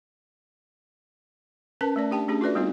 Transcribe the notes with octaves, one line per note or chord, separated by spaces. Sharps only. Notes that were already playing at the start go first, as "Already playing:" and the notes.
C#4 A#4 B4 A5
A3 C#4 D5
D4 G4 G5 A5
A3 C#4 D4 G4 G#4
F4 F#4 A4 B4 D5 E5
G3 B3 C4 D#4 F4 F#4